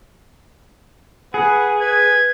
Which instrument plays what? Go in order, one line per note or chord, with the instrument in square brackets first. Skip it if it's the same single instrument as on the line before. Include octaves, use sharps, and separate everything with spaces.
[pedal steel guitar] G#4 [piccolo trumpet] B4 [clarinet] F#5
[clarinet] B4 [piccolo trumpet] G#6